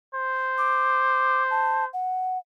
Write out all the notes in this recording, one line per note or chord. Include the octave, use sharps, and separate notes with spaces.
C5
D6
A5
F#5